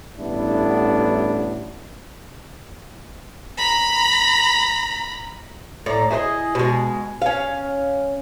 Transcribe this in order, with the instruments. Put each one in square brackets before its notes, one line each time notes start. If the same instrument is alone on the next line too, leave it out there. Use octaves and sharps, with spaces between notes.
[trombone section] A1 G2 A3 B3 D4 E4
[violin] A#5 B5
[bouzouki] A2 D5 A#5
E4 G#4 B4 D#5
B2 G#3
C#4 F5